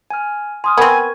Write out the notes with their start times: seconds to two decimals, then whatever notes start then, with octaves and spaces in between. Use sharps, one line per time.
0.10 G#5 F6
0.64 G#5 C6 D#6 F6
0.78 B3 C4 A#4 G#5 C#6 G#6